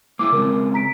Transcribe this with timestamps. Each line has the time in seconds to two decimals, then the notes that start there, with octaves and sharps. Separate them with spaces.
0.19 A#3 E4 D6
0.32 C#3 G#3 C4 A#4
0.74 A#5 B6 D7